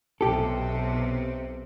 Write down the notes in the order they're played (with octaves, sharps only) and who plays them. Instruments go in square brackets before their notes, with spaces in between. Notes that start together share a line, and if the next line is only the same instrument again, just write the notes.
[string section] B1 C3 [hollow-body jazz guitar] G4 A4